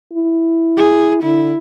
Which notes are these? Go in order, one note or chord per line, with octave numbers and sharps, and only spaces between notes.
E4
G#4
D3 E4